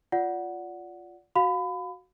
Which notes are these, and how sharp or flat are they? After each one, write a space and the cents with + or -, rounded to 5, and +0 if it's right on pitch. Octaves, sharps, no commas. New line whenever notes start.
F4 +0 D5 -20 F#5 +0
F#4 +0 F5 +30 B5 +30